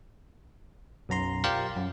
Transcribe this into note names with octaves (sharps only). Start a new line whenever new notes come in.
B1 F#2 A#5 C6
F4 G4 A#4 C5 D5 F5
F#2